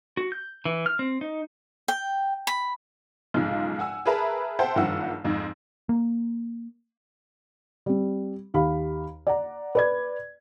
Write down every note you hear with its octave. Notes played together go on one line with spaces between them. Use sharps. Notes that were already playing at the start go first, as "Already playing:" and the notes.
F#4
G6
E3
F6
C4
D#4
G5
B5
B1 G#2 C#3 F3 G#3
F#5 G#5 E6
G#4 A#4 B4 E5 A5 A#5
C5 E5 F#5 G5 A5
F#1 G2 D#3 F3 F#5 E6
F2 G#2
A#3
G3 C4
D#2 G4 F5 B5
D5 F#5 A#5
B4 D5 G#6